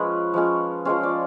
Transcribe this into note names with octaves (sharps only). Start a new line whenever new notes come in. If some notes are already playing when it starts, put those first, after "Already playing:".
Already playing: F3 G#3 C#4 B4
F3 G#3 C#4
F3 G#3 C#4 C5
D5